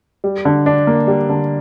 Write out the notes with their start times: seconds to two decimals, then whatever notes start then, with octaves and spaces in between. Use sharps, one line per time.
0.24 G3
0.45 D3
0.66 D4
0.87 A#3
1.07 G3
1.29 D3